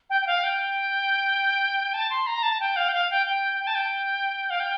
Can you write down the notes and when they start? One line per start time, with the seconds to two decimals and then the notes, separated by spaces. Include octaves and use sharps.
0.10 G5
0.22 G5
0.27 F5
0.44 G5
1.94 A5
2.10 C6
2.27 A#5
2.43 A5
2.60 G5
2.76 F5
2.89 G5
2.94 F5
3.11 G5
3.26 G5
3.60 G5
3.67 A5
3.75 G5
4.50 F5
4.60 G5